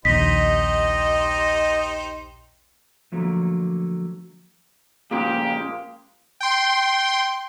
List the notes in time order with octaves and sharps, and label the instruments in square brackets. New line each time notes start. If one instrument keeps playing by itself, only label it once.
[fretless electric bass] A#1 D#2 [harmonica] D#4 G4 C5 [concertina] D#5 [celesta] B6
[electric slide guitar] D3 F3 F#3 A3 A#3
[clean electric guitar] A#2 C#3 F3 [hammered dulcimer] G#3 A#3 [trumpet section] G4
[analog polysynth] G5 C6